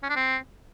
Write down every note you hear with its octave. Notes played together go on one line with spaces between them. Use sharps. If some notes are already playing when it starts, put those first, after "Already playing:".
C#4
D4
C4